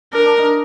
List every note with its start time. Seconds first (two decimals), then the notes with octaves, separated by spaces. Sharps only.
0.13 D4 A#4
0.26 D4
0.38 D#4